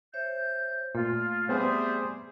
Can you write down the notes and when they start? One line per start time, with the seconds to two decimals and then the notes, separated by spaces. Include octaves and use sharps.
0.14 C5 C#5 E5 G6
0.95 A#2 A3 F4
1.49 G3 B3 C4 G#4 C5 E5